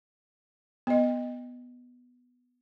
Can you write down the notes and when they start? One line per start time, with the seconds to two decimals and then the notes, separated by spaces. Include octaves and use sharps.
0.87 B3 D#5